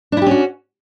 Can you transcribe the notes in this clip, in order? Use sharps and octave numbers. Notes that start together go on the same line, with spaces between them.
C#4 D4 E4 F#4 G4